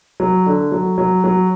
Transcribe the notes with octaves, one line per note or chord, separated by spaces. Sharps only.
F#3
D3
F#3
F#3
F#3